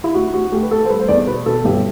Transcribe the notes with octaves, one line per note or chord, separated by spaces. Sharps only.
E4
D2 F#4
D2 F#4
A3 G4
B4
A3 A4
C5
G3 B4
C5
E2 D5
B2 B4
B2 A4
G1 G4